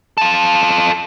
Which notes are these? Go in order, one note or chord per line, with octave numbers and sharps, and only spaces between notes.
F4 A4